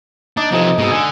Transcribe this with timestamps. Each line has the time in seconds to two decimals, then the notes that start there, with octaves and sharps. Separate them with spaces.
0.37 D4 D#4 D6
0.52 C3 E3 F3 D#4 A4 D#5
0.78 G#2 B2 D#6 E6
0.92 D3 G#5